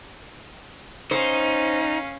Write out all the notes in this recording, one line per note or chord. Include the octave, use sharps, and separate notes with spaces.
C#4 D#4 C5 F5